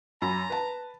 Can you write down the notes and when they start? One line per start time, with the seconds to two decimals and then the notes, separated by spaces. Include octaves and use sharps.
0.22 F#2 A#5 B5
0.50 B4 A5